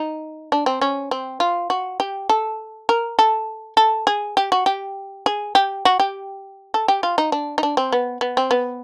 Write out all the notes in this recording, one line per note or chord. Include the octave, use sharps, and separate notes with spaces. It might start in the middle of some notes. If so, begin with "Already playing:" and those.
Already playing: D#4
D4
C4
C#4
C4
F4
F#4
G4
A4
A#4
A4
A4
G#4
G4
F#4
G4
G#4
G4
F#4
G4
A4
G4
F4
D#4
D4
D#4
D4
C4
B3
B3
C4
B3